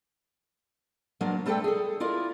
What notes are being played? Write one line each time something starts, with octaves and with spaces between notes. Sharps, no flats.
F3 F#3 A#3 B3 D4
G3 A3 D4 A4 C5 G5
G#4 A4
E4 F4 A#4 D5